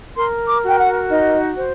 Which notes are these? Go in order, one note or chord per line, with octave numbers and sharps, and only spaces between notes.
A#4 C6
D6
F#4 G5
F#5
D#4 D#5
C5